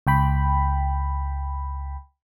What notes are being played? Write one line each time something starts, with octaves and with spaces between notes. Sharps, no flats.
C#2 G5 B5